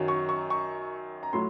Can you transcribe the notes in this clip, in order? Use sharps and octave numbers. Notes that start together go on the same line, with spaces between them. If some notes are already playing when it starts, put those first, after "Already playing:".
Already playing: F#2 D#3 F#3
C#6
C#6
C#6
A#5
A2 F#3 C6